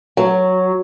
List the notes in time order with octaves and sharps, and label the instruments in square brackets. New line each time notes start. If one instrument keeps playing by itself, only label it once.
[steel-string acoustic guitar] F#3